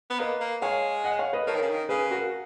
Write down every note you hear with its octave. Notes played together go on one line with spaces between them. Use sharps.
B3
A#3 B4 D#5
A#3
G#3 C#5 F5
D#5 F#5
C#5 F5
B4 D#5
F3 A#4 C#5
D#3
C#3
D#3
C#3 G#4 B4
F#4 A#4